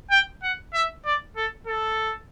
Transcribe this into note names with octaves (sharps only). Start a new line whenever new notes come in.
G5
F#5
E5
D5
A4
A4